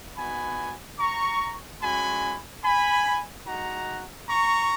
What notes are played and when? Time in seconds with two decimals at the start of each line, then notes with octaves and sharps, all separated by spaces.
0.17 B3 D#4 F#4 G#5 B5
0.99 A#5 C#6
1.81 G#3 C#4 F#4 G#5 B5
2.64 G#5 B5
3.46 G#3 D#4 F#4 F#5 A#5
4.29 A#5 C#6